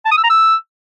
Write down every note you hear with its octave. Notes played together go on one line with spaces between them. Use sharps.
A5
D#6
E6
A#5
E6